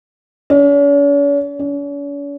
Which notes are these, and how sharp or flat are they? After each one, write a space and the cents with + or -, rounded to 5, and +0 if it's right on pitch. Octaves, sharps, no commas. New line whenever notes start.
C#4 +45
C#4 +45